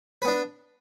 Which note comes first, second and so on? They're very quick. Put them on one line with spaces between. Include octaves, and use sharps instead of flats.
B4 B3 D4